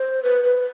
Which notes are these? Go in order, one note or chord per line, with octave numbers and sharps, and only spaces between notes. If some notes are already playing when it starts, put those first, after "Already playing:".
Already playing: C5
B4
B4